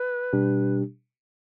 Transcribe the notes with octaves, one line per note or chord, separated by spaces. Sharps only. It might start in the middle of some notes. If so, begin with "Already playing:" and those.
Already playing: B4
B2 G3 D4 G4